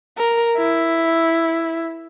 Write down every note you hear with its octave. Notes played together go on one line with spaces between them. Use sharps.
A#4
E4